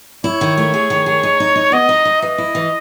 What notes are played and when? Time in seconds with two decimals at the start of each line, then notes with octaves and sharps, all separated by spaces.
0.24 E4 C#5
0.41 D#3
0.57 A3
0.74 G#4
0.90 D#3
1.06 G#4
1.23 D#4
1.40 D#4
1.56 D#4
1.72 B3 D#5
1.89 D#4
2.05 D#4
2.21 E3 D#5
2.38 E4
2.55 E3